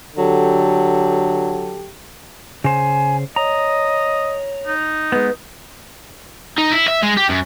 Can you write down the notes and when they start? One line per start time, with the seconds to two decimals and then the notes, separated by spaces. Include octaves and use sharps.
0.16 D3 F#3 G4 A4
2.64 C#3 C5 G#5
3.36 C#5 D#5 A#5
4.67 D#4
5.12 G#3 B3 B4
6.58 D#4
6.72 E4
6.88 E5
7.03 G#3
7.17 G4
7.29 F#2